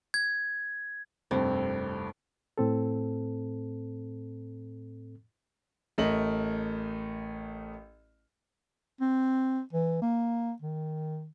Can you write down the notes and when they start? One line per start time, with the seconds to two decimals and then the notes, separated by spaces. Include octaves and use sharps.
0.14 G#6
1.31 F1 C2 G2 C4
2.58 A2 C4 A4
5.98 A1 A3 A#4 D#5 F#7
9.01 C4
9.73 E3
10.02 A#3
10.62 D#3